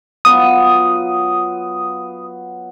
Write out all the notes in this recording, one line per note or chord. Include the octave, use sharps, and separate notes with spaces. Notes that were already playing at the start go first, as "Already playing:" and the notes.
F#3 B3 F4 D#6